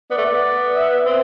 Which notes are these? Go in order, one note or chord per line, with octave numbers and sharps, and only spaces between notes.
B3 D5
A3
B3
E5
C4